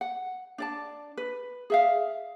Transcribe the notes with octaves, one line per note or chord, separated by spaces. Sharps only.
F#5
D4 D5 A5
B4
G#4 E5 F5